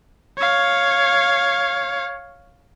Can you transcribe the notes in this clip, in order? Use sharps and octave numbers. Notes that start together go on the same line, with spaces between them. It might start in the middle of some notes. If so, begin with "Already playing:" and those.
C#5 F5